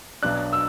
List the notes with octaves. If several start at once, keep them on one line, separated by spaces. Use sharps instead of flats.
B1 B2 F#3 D4 F#6
E6